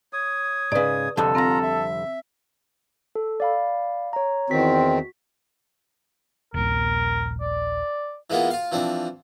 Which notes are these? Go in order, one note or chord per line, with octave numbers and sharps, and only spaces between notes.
C#5 D#6
G#2 C#3 B4 D5
C2 F2 D3 A4
C4 F4 A#5 A#6
E5
A4
D5 F5 B5
C#5 A#5
E2 D#3 C4 F#4 B6
D#1 A#1 A#4
D5
E3 G#3 A#3 B3 F4
F4 F5
E3 F3 C4 D4